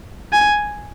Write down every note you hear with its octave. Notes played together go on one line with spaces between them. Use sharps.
G#5